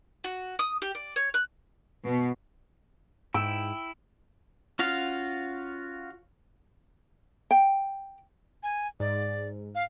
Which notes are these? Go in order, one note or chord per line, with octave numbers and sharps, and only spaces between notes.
F#4
D#6
G4
D5
C#5
F#6
B2
G#2 E4 G5 E6
C#4 F4 F#4 F5
G5
G#5
G#2 D5
F5